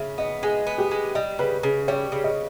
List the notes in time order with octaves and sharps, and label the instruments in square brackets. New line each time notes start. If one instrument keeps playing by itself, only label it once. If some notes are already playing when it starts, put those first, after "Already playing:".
Already playing: [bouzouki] C#3 [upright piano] E5
[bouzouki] B3 [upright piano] D#5
[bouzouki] G#3 [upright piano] G#4
[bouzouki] B3
[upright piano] G4
[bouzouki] G#3
[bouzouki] G3 [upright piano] D#5
[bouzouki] C#3 [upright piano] B4
[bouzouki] C#3
[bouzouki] G3 [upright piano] C#5
[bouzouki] C#3
[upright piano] D#5